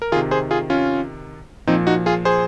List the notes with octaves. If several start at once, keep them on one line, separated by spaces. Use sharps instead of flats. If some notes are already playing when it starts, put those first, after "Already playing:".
A#4
C3 D#3 F4 G#4
G#4 C5
F4 G#4
C#4 F4
A#2 F3 C4 D#4
D#4 F#4
F4 G#4
G#4 C5